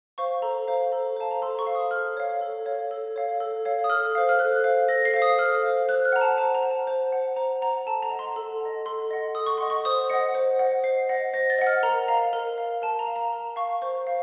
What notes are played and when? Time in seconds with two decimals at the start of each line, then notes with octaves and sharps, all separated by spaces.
0.18 C5 F5 C#6
0.42 A4 A#5
0.68 C5 F5
0.92 A4 A#5
1.17 C5 F5 A5
1.31 A#5
1.42 A4 C6
1.59 C#6
1.67 C5 F5
1.75 D#6
1.91 A4 F6
2.17 C#5 F5
2.41 A4
2.66 C#5 F5
2.91 A4
3.16 C#5 F5
3.40 A4
3.65 C#5 F5
3.84 D#6
3.90 A4 F6
4.15 C5 F5
4.29 F6
4.39 A4 F#6
4.64 C5 F5
4.88 A4 A#6
5.05 C7
5.14 C5 F5
5.22 D#6
5.38 A4 F6
5.63 C5 F5
5.89 C5 F#6
6.05 F6
6.12 F#5 A#5
6.21 A5
6.38 C5 A5
6.55 A#5
6.63 F#5
6.71 A5
6.87 C5
7.12 F#5
7.36 C5 A#5
7.62 F#5 A#5
7.86 A4 A5
8.02 A#5
8.11 D#5 F#5
8.19 C6
8.36 A4 A#5
8.60 D#5 F#5
8.86 A4 C6
9.11 D#5 F#5
9.35 A4 D#6
9.46 C#6
9.58 D#5 F#5 C6
9.70 C#6
9.85 C5 D#6
10.10 D#5 F#5 C#7
10.35 C5
10.59 D#5 F#5
10.84 C5 C7
11.09 D#5 F#5
11.34 C5 A#6
11.50 A6
11.59 D#5 F#5
11.67 F6
11.83 A#4 A#5
12.08 F5 A#5
12.33 A#4
12.58 F5
12.82 A#4 A5
12.99 A#5
13.07 F5
13.16 A#5
13.33 A#4
13.56 F5 C#6
13.82 C5 C#6
14.07 F5